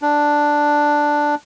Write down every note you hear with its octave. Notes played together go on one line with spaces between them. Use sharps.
D4